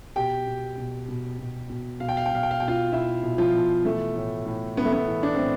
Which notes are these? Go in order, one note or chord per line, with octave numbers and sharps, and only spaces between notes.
B2 G4 G5
B2
B2
B2
B2
B2
B2 F5
G5
F5
G5
B2 F5
G5
F5
B2 G5
F4 F5
B2 E4 E5
B2
F3 F4
B2
E3 A3
A2
A2
E3 B3
A3
B3
E3
D4
A2 C4